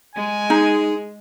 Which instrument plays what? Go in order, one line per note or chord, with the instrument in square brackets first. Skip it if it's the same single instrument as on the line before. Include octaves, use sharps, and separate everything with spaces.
[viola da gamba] G#3 [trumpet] G#5
[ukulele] D#4 [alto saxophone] G#4